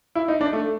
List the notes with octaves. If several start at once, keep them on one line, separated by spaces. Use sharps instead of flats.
E4
D#4
D4
A3